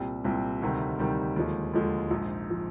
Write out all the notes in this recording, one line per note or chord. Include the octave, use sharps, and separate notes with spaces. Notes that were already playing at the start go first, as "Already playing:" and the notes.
Already playing: C2 A#2 G3 C4
C2 A#2 G3 C4
D2 C3 D#3 G3
D2 C3 D#3 G3
D#2 D3 F3 G#3
D#2 D3 F3 G#3
A#1 G#2 F3
F3